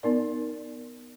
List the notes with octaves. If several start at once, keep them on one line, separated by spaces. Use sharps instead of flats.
B3 D#4 A#4 D5